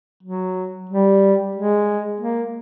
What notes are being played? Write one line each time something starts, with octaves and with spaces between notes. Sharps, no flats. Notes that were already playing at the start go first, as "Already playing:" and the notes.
F#3
G3
G#3
A#3